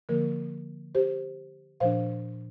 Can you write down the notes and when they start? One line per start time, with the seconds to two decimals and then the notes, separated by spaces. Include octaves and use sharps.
0.09 D3 F3 A#3 A#4
0.95 G4 C5
1.80 A#2 F3 D4 C5 F5